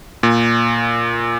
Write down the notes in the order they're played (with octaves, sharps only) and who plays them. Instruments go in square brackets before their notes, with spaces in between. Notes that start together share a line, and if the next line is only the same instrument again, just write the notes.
[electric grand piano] A#2